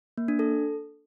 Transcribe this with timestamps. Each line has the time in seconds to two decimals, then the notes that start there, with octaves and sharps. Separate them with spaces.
0.18 A#3
0.28 D4
0.39 A4